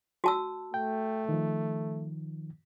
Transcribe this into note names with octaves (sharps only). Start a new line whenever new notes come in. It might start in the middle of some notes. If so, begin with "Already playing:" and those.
F#4 A5 E6
A3 G5
D#3 F3